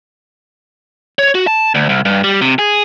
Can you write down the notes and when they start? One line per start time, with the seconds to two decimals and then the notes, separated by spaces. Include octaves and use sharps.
1.19 C#5
1.35 F#4
1.47 A5
1.75 D2
1.89 C2
2.05 G2
2.24 G3
2.42 C3
2.59 G#4